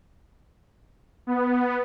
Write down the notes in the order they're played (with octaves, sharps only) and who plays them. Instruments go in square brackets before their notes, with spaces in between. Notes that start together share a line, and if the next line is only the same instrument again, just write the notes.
[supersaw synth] B3